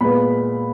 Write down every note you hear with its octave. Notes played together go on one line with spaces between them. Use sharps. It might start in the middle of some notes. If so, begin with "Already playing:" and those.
A#2 G#3 B3 B5